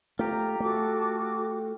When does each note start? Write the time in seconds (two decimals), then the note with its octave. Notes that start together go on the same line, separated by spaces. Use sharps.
0.19 A3 F4 G4 A#5
0.60 A3 F#4 A4 D6